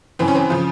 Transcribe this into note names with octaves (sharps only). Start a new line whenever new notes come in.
F#2 C#3 E3 C4
C#4
C4
C#3 F3